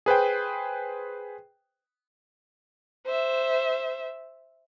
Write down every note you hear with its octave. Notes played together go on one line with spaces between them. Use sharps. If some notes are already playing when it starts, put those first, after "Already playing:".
G#4 B4 C5 G5
C5 E5